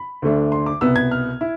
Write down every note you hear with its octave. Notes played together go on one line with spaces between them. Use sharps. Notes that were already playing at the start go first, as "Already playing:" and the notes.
Already playing: B5
D2 D3 A3 D4
C6
D6
C2 B2 B3 E6
G#6
F6
E4